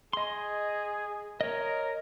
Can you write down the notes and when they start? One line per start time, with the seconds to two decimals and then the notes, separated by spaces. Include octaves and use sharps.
0.13 G#4 D#5 C6
1.41 A#4 C#5 D#5